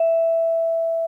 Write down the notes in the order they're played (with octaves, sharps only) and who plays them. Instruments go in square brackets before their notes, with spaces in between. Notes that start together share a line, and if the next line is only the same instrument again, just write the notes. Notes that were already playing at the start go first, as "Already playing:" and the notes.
Already playing: [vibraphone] E5